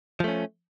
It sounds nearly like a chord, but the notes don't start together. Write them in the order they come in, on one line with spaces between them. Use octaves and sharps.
F3 A3 C#4